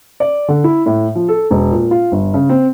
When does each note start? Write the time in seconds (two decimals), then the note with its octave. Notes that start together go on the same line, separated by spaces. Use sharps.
0.20 D5
0.48 D3
0.64 E4
0.86 A2
1.15 F3
1.29 A4
1.51 E1
1.72 A#2
1.91 F4
2.12 G1
2.34 C#3
2.49 C4